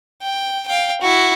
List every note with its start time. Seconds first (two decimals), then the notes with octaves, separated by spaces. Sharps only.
0.22 G5
0.68 F5 G5
1.02 E4 F#4